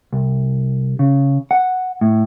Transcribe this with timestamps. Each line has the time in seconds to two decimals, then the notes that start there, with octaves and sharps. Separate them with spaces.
0.13 C2
0.99 C#3
1.51 F#5
2.01 A2